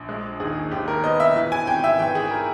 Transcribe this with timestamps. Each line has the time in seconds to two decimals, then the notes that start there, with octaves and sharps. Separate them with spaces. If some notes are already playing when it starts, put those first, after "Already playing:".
Already playing: A#1
0.09 G#3
0.40 D#2 G#4
0.71 D#2 G4
0.88 A#4
1.04 B3 D#5
1.20 E5
1.36 E3
1.52 G#5
1.67 G#1 G5
1.84 E5
1.99 E3 G5
2.15 G#4
2.31 A#4